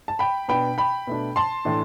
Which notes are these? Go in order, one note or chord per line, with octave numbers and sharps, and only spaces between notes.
A5
G5 B5
B2 B3 D4 G5 B5
G5 B5
B2 A3 D4
A5 C6
A2 E3 A3 D4